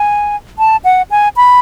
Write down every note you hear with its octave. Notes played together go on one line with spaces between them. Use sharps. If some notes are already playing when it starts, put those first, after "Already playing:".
Already playing: G#5
A5
F#5
G#5
B5